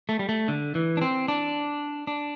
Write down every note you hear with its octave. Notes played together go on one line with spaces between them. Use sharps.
A3
G3
A3
D3
E3
D4
C4
D4
D4